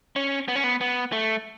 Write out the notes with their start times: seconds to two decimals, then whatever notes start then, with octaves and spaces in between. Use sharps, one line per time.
0.16 C#4
0.48 B3
0.56 C#4
0.64 B3
0.81 B3
1.13 A3